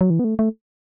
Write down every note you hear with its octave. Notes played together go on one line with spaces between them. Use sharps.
F#3
E3
B3
A3
A3